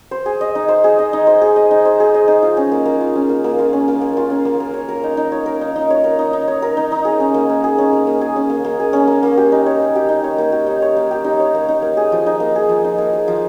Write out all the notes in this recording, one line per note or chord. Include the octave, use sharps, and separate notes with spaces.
C5
G#4
D#5
D#4
C5
G#4
D#5
D#4
C5
G#4
D#5
D#4
C5
G#4
D#5
D#4
F4
C#4
A#3
A#3
F4
C#4
A#3
A#3
F4
C#4
A#3
A#3
F4
C#4
A#3
A#3
C#5
A#4
D#4
D#4
C#5
A#4
D#4
D#4
C#5
A#4
D#4
D#4
C#5
A#4
D#4
D#4
G#4
C#4
A#3
A#3
G#4
C#4
A#3
A#3
G#4
C#4
A#3
A#3
G#4
C#4
A#3
A#3
G4
D#4
C#5
A#3
G4
D#4
C#5
A#3
G4
D#4
C#5
A#3
G4
D#4
C#5
A#3
D#4
A#3
G#4
F3
D#4
A#3
G#4
F3
D#4
A#3
G#4
F3